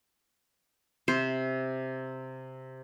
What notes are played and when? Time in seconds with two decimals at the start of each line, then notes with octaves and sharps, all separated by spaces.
1.08 C3 C5